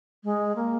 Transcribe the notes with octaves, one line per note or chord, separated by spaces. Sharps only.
G#3
A#3